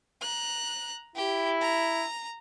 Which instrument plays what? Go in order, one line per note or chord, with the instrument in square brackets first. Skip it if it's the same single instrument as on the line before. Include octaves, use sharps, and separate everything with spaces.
[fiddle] A#5 F#6
[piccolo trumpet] E4 [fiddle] G4
[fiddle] A#5